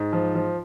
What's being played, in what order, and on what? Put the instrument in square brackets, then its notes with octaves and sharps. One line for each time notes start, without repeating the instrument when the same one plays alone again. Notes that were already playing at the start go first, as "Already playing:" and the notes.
Already playing: [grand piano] G#2
F3
F3